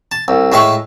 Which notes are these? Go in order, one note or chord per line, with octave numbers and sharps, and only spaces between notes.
A5
C2
A2 G#3 E5 F5 C#6